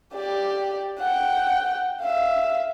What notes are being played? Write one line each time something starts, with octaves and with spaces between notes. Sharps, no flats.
G4 D5
F#5 G5
E5 F5